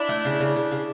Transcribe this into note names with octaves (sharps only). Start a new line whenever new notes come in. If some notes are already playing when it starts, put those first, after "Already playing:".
Already playing: D4 E4
A3
C#3
C#3
C#3
C#3